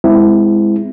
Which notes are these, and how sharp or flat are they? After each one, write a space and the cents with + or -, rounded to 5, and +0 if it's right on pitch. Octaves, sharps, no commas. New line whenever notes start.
G#3 -15 C4 -30 E4 +0